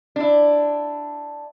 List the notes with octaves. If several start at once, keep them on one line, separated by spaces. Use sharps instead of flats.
D4 E4